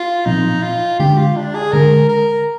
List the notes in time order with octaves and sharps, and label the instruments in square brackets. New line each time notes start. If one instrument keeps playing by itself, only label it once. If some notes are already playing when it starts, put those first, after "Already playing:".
Already playing: [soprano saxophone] F4
[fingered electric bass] A#2 F3 C4 [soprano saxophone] D#4
[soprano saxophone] F4
[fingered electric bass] D3 G#3 D4 [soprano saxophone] G4
[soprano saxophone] F4
D4
G#4
[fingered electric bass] D3 G#3 D4 [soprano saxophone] A#4
[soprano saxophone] A#4